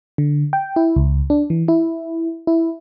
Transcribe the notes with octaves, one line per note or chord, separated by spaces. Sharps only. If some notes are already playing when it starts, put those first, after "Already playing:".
D3
G5
E4
C#2
D4
E3
E4
E4